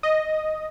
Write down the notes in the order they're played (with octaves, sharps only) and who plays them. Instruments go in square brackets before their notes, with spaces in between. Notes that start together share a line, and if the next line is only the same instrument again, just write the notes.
[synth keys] D#5